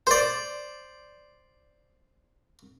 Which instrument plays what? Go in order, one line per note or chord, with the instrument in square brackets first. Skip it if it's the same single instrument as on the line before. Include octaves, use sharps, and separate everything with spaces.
[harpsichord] C5 D5